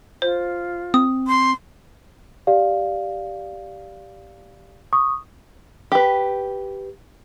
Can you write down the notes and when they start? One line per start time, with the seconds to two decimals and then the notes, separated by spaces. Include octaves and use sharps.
0.22 F4 C5
0.94 C4 D#6
1.28 C6
2.47 G4 D5 F5
4.93 C#6 D#6
5.92 G4 B4